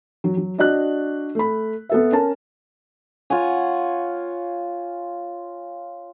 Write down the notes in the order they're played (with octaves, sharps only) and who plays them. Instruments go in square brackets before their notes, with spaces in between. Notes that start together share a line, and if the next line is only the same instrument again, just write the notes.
[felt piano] F#3
F#3
D4 F#4 D5 D#5 F#6
A3 B5
B3 A4 E5
C#4 A#4 A5
[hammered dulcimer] F4 C#5 F#5 G#5